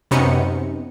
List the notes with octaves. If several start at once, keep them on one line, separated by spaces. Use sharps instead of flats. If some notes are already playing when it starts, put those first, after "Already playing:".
F#2 C3 B3 C#4 D#4 C#7